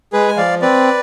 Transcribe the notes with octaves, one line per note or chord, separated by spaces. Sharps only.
G#3 G#4 B4
G#5
F3 D5 F5
C4 B4 D5